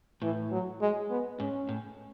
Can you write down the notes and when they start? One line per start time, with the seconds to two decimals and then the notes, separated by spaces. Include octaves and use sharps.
0.22 A2 E3
0.52 F#3
0.81 G#3
1.10 B3
1.40 G#2 C#4
1.69 A2